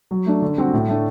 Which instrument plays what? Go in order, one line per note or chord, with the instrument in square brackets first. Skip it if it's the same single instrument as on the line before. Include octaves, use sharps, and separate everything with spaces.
[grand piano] F#3
A3 D4
D3
G3 C4 F#4
A2
A3 D4